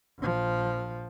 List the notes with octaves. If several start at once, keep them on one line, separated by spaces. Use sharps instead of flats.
A#1 F3